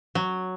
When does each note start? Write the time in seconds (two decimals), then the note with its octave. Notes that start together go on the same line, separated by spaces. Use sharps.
0.15 F#3